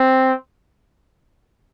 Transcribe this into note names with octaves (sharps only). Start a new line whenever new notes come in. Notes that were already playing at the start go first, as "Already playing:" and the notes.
Already playing: C4